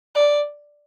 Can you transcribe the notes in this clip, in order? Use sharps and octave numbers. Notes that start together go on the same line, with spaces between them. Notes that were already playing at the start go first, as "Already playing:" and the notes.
D5